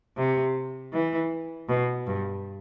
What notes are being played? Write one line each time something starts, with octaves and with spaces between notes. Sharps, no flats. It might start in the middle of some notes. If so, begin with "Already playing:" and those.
C3
E3
B2
G2